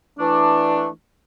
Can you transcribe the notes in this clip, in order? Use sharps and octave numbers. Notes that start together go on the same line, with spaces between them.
E3 A3 D4